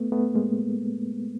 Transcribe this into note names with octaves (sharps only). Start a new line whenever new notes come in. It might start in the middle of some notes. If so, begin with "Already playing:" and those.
Already playing: A3 B3
A3 B3
G#3 A#3